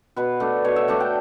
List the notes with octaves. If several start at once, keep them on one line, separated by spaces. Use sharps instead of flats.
B2 B4
A3 D4
B2 C#5
E5
A3 D4 F#5
G5